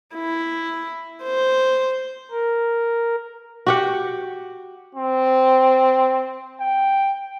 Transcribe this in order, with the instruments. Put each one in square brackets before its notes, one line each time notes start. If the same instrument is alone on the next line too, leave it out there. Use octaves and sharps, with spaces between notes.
[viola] E4
C5
[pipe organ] A#4
[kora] F#4 G4 F#5
[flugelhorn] C4
G5